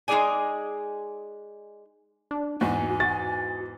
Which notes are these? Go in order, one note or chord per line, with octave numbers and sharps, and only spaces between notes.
G#3 D#4 F4 G#4 D5 G#5
D4
E2 G#2 F#4 G#5
F#4 A6